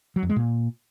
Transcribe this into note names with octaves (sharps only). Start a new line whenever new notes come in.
F#3
F2
G#3
A#2